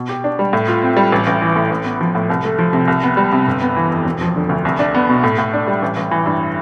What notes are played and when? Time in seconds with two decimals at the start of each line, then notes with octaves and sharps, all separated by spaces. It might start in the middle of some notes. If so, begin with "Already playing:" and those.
Already playing: B2
0.09 G4
0.24 D4
0.39 G3
0.53 A2
0.68 F4
0.82 C4
0.97 G3
1.12 A1
1.27 A1
1.42 E3
1.56 A2
1.70 A1
1.85 B3
2.01 F3
2.15 A2
2.30 C2
2.45 A3
2.59 F3
2.73 C3
2.88 C2
3.03 B3
3.17 G3
3.32 C3
3.47 G1
3.61 B3
3.76 E3
3.91 F2
4.05 E1
4.21 F3
4.36 D3
4.49 D2
4.65 C2
4.79 D4
4.95 B3
5.09 B2
5.24 A2
5.38 A2
5.53 D4
5.67 G3
5.82 A1
5.97 A1
6.11 E3
6.26 G2